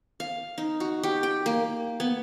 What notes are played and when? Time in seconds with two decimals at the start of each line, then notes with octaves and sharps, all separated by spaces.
0.20 F5
0.58 D#4
0.80 F#4
1.03 G4
1.23 G5
1.46 A#3
2.00 B3